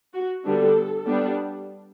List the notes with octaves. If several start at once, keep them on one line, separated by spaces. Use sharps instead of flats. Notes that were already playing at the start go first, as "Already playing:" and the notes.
F#4
D3 G3 B3 D4 A4
G3 B3 D4